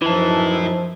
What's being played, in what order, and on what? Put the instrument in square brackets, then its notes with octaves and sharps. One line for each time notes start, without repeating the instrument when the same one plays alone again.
[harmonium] F#2 D#4 E5 [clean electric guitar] E3 [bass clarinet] F3 [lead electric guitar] E4 A5